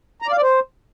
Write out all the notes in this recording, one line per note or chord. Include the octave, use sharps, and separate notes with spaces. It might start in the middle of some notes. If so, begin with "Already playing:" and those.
A#5
D5
F5
D5
C5